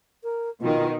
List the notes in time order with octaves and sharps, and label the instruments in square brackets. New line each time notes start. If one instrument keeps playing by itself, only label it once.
[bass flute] A#4
[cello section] B2 D#3 [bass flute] F4